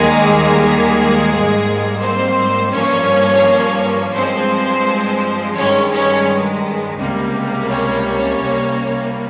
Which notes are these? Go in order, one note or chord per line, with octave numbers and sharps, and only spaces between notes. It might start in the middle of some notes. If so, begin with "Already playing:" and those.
Already playing: D#2 D#3 G3 G#3 A#3 G#4
G#3 G#4
G#2 G3 A#3
C4 C5
G2 F3 A#3 C#4 C#5
G2 F3 G#3 C4 C5
G2 D#3 G#3 C#4 C#5
C#4 C#5
C#2 C3 G3 A#3
C#4 C#5
C2 C3 G3 A#3